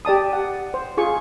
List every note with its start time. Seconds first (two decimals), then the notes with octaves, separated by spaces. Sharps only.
0.05 G4 D5 A5 D#6
0.33 F#5
0.74 C5
0.97 F4 G#4 C#6